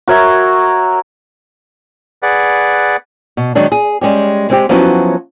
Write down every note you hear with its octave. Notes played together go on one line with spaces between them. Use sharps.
F#4 A#4 C#5 E5
G#4 B4 D5 F#5
B2
D#3 F#3 G#3 D4
G#4
G3 G#3 C#4 G4
G#3 C4 G4
F3 F#3 B3 C#4 E4 F#4